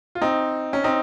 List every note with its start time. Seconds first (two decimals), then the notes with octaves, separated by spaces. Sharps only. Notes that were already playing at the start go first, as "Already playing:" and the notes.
0.15 F4
0.22 C4 D#4
0.73 C#4
0.84 C4 D#4